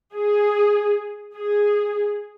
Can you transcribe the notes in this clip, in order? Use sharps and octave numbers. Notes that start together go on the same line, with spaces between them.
G#4
G#4